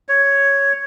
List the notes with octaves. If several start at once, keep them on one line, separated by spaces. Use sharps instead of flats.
C#5